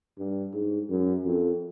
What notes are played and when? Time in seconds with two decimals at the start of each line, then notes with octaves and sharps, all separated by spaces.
0.18 G2
0.53 G#2
0.90 F#2
1.25 F2